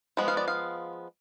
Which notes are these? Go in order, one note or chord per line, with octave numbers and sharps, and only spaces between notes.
F3 G#3 B3
F5
D5
F5